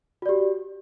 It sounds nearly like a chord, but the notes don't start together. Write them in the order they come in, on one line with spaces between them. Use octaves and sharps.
F#4 D5 G4